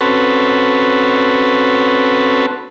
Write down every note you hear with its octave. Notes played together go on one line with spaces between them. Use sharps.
C4 C#4 F#4 A4 B4